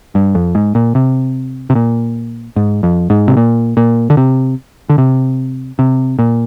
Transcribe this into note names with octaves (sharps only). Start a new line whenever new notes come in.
G2
F2
G#2
A#2
C3
C3
A#2
G#2
F2
G#2
C3
A#2
A#2
D3
C3
D3
C3
C3
A#2